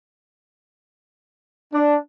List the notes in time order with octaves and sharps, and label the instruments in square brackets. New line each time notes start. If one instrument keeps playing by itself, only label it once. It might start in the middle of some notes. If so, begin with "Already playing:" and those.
[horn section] D4